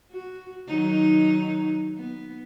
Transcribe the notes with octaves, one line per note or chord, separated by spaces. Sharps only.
F#4
D#3 F#3 D#4
B3